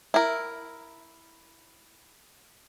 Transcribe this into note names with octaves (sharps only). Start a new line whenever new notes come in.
E4 A#4